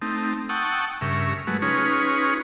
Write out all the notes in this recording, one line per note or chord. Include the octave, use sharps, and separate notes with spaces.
A3 C4 D#4
F#5 G5 A5 C#6 D#6 E6
G2 C#3 A#4 E5 C#6
F#3 G#3 A3 F#4 B4
C#4 D#4 F4 G#4 B4 C#5